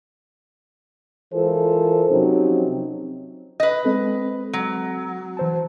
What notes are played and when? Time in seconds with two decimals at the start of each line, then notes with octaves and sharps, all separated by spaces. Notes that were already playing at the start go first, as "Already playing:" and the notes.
1.33 E3 G#3 F4 A4 A#4 C5
2.10 C3 F3 F#3 C4 C#4 D#4
3.60 B4 D#5
3.85 G#3 C4 A4
4.53 F#3
5.37 E3 C5 A5